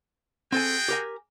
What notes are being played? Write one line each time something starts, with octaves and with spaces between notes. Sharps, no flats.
C4 F#4 G#4 A4 G5 G#5
G4 A#4 G#5